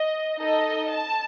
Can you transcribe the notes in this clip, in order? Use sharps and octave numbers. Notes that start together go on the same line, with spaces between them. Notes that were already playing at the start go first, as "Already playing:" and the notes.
Already playing: D#5
D#4 A4 D#5
A5